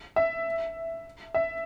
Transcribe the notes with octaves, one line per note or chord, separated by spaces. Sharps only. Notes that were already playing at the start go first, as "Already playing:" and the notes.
E5
E5